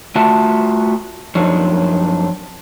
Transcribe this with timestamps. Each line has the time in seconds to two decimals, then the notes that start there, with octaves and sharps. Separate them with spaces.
0.15 A3 F4 F#4 E5 F#5 A5
1.35 F#2 F3 D4 D#4 C#5